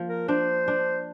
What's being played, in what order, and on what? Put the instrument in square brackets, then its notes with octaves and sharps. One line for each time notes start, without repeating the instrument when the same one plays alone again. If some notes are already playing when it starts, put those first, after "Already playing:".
Already playing: [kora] F3 A#3
[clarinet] A#4
[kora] D4 [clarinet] C5
[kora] D4